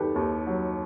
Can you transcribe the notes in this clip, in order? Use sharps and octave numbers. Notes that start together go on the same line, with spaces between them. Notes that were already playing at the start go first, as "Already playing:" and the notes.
Already playing: D#2 D#3 F#3 G4 A4 B4
D#2
F#3